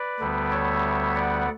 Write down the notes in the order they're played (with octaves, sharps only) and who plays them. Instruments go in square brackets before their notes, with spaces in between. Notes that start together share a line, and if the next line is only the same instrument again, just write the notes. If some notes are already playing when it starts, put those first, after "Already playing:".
Already playing: [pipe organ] B4 D5
D2 D3 G3 B3
C#5 E5
D5 F#5